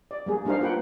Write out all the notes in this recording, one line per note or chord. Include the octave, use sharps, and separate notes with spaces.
D5
G3 A#3 G#4
G3 D4 D#4 A#4 C5 F5
A#3 F4 B4 F#5 G5